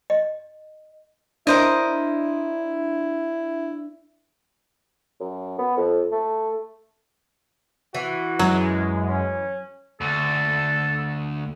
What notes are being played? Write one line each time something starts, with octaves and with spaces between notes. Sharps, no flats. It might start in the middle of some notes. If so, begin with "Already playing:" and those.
D#5
D4 E4 A#4 C5 D#5
F#2
B3
F2
A3
E3 F#4
F#2 F#3 G#3
C#4
D2 A4